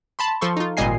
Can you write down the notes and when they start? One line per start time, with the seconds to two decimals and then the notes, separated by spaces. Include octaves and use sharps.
0.19 A5 B5 C6
0.41 F3 A4 C6 C#6
0.57 D#4 F4
0.77 G#1 A#2 G3 D#5 G#5 C7